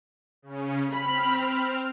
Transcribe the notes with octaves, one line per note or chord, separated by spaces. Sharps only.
C#3 C#4
C4 B5 F6